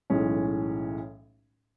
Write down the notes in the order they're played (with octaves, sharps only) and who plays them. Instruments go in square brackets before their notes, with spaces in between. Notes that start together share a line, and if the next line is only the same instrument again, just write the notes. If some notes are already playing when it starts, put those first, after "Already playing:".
[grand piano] B1 A2 E3 G#3 C#4